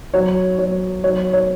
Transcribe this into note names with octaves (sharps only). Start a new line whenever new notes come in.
F#3 C#5
F#3 C#5
F#3 C#5
C#5